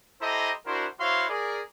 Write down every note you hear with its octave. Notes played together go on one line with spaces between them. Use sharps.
E4 G4 A4 C5 D#5 A#5
D4 E4 F#4 A#4 C5
E4 F#4 C5 C#5 F5 C6
G#4 A#4 D5